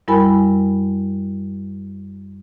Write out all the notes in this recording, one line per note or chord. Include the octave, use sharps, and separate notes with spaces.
F#2 G3 E4 A#4 G#5 B5